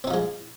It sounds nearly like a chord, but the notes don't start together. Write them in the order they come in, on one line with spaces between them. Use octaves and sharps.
C4 D#4 F3 G#3